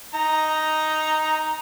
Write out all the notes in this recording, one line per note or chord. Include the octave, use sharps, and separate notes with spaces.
D#4 A#5